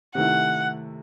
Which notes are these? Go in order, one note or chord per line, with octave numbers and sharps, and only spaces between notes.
C3 D#3 A3 E4 F#5